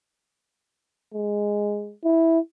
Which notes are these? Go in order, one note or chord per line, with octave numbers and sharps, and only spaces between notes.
G#3
E4